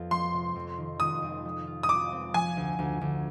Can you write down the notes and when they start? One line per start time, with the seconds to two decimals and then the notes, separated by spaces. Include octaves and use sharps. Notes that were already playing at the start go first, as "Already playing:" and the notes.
Already playing: F2 B3 F4
0.10 F3 C6
0.33 C3
0.56 F2
0.78 D#3
1.00 D#3 D#6
1.22 F2
1.45 F3
1.67 F4
1.83 D#6
1.89 F3 D6
2.12 C4
2.34 F3 G#5
2.57 D2
2.79 D2
3.01 D2